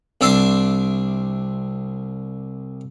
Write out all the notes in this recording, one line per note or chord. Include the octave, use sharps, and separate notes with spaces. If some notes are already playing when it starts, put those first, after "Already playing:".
C2 D4 E5 C6 D6